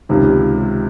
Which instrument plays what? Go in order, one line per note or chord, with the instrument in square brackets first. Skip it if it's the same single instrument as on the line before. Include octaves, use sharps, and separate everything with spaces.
[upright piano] C#2 C3 D#3